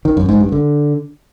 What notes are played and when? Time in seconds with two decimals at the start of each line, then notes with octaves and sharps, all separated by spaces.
0.05 D#3
0.17 F#2
0.29 G#2
0.40 G2
0.52 D3